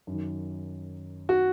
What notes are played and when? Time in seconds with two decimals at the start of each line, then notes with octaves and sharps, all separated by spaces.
0.07 F#2 D#3
1.29 F#4